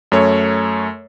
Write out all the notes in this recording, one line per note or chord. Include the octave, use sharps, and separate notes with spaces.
F#2 A3 C#5